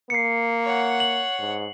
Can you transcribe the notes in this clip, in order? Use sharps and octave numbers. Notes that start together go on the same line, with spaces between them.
A#3 C7 C#7
C#5 F#5
F#7
G#2